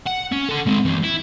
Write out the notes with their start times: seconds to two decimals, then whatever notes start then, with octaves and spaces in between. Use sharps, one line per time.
0.07 F#5
0.32 C#4
0.49 A4 F#5
0.67 G#3 C4
0.85 E3 A#3
1.03 E4